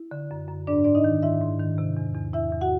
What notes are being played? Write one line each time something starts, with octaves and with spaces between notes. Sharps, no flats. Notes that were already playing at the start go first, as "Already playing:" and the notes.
Already playing: E4
D3
F#2
F#2
G#2 D4 D5
G#2 D5
D#4 D#5
D#3
G#2 E4 E5
G#2
D#3
C3
E2
E2
E2 E4 E5
E2
F#4 F#5